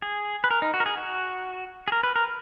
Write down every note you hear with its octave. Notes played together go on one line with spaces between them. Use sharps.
G#4
B4
A#4
D#4
F#4
A#4
G#4
F#4
G#4
A#4
B4
A#4